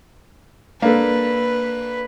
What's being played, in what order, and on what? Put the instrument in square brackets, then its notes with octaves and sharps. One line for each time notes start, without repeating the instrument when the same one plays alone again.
[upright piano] A#3 D4 A4 [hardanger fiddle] B4